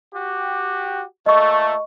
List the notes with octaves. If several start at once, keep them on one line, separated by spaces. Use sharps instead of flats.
F#4 G4
A#2 A3 D#5 C#6